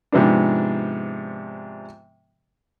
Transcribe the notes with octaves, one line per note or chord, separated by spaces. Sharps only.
G#2 C3 F3 B3 D4